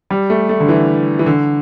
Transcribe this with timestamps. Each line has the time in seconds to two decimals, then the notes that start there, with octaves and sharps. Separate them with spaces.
0.10 G3
0.30 A3
0.49 A3
0.60 D3
0.68 E3
1.19 E3
1.26 D3